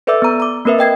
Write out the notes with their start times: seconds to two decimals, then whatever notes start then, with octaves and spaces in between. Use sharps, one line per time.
0.07 A4 B4 D5 E5 D6 E6
0.22 B3 A#5
0.40 A#5 D6
0.65 A#3 C4 A#4 B4 E5
0.79 D#5 G5 G#6 C7